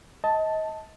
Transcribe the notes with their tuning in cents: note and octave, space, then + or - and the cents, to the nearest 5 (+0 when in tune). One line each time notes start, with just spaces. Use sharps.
D#5 +30 A5 +0